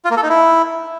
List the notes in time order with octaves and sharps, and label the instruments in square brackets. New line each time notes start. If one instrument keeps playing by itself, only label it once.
[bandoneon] F4
A#3
A4
D#4
E4